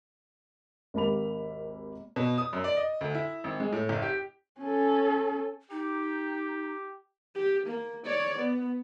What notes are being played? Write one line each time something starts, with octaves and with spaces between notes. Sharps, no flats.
G#1 D#2 A#3 G4 B5 F7
B2
D#6
F#2
D5
D#5
D2
E4
G#1
G#3
A2
F#1
G4
C#4 A4
D#4 G4
G4
A#3
C#5 D5
B3